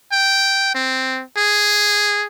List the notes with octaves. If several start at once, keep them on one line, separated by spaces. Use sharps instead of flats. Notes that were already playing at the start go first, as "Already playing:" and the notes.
G5
C4
G#4